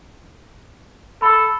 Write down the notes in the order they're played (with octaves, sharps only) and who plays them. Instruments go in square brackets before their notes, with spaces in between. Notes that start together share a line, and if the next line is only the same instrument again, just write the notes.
[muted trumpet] A4 [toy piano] B5